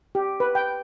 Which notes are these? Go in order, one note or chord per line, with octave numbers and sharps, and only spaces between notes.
G4
B4
G5